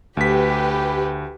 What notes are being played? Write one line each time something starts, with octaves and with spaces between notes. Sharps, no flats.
D2 G4 B4 B6